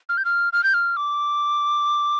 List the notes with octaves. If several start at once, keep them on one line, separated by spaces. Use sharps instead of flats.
F6
G6
F6
F6
G6
F6
D6